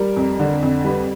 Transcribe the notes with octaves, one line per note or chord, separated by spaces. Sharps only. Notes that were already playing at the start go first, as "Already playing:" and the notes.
Already playing: G3 A#4
F2
D3
F2
G3 B4